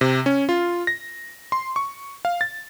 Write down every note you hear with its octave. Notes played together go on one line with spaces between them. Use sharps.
C3
C#4
F4
A#6
C6
C#6
F5
A6